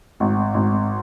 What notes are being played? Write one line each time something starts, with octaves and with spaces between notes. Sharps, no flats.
G#1
G#1